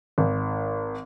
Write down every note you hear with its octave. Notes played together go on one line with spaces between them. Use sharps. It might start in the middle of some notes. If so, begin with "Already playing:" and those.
G#1